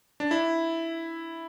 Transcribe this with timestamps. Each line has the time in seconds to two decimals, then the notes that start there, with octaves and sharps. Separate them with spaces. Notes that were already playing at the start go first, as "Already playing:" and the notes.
0.20 D4
0.31 E4